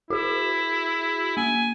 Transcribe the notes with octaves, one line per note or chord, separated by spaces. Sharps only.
E4 F#4 G#4 E7
A#3 G#5